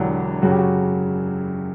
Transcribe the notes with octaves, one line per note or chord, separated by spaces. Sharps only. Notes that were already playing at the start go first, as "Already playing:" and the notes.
Already playing: E1 E2 D3 F#3 G4
F#2 C#3 F#3 F#4
G4
F#4